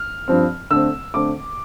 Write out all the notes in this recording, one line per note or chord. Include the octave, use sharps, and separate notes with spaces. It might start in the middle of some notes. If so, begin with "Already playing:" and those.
Already playing: F6
G2 F3 C4
D3 A3 C4 E6
D3 A3 C4 D6